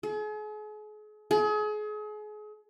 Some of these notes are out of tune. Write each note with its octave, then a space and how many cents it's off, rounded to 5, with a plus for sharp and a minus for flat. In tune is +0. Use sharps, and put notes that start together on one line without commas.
G#4 +40
G#4 +35